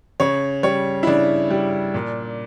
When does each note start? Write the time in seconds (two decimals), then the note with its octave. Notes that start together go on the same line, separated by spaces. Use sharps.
0.20 C#3 C#5
0.63 G3 C#5
1.03 E4
1.07 C#3 D4
1.50 G3
1.94 A#2